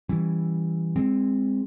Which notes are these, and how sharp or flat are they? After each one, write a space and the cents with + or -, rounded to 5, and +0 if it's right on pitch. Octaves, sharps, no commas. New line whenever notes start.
E3 +0 G3 +0 C#4 +0
G#3 -30 C4 +0